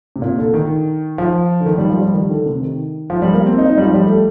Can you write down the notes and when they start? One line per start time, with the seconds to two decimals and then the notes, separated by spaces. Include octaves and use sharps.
0.16 C3
0.22 A#2
0.38 D3
0.54 D#3
1.18 F3
1.60 D3
1.66 D#3
1.78 G3
1.90 F3
2.01 G3
2.14 D#3
2.30 D3
2.46 C3
2.62 D#3
3.10 F3
3.22 G3
3.34 A#3
3.46 C4
3.58 D#4
3.70 D#4
3.78 G3
3.82 F3
3.94 G3
4.05 A3